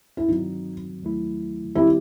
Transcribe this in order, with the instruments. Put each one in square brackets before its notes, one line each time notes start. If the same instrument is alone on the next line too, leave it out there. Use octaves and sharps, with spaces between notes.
[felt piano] E4
[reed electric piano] G2 D#3 F#3 C4 F#4 [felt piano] D#4
[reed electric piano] D#2 D#3 F#3 A3 E4
[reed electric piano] D#3 G3 C4 D#4 G4 [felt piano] E4